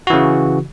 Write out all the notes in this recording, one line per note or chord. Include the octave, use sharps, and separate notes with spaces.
C#3 E3 F#4